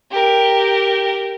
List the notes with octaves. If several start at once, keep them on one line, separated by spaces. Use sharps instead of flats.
G4 A#4